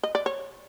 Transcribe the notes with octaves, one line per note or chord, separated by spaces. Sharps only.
D#5
D5
C#5